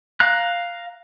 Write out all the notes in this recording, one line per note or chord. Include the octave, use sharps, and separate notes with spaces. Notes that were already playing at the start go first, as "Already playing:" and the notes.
F5 A#5 F#6